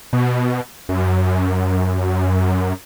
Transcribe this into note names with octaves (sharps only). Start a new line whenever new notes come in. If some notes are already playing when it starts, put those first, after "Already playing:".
B2
F#2